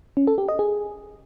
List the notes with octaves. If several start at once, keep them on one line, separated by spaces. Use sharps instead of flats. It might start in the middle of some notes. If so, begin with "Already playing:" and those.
C#4
A4
G4
D#5
G#4